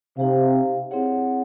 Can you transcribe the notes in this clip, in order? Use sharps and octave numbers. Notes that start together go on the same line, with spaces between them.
C3 D#4 G4 C5 F5
C4 E4 G#4 C#5 F#5